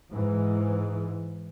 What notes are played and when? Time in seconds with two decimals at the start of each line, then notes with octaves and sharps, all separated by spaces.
0.11 G#2 E3